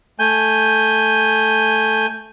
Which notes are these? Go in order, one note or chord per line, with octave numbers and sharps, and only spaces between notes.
A3 G#5 G6